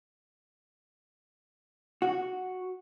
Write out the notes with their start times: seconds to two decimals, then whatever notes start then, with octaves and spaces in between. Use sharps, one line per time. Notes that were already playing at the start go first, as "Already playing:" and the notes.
2.02 F#4